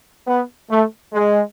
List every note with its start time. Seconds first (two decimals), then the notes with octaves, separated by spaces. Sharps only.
0.27 B3
0.70 A3
1.13 G#3